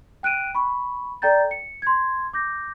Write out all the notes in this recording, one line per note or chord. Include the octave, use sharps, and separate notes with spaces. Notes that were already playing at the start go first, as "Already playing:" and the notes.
G5 F#6 D7 D#7
B5 C#6
A4 D5 G5 A#5 G6 A6
C#7
C6 G#6
D6 G6 A#6